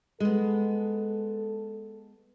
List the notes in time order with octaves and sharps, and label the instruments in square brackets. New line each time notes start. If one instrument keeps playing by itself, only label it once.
[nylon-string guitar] G#3 B3 [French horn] A4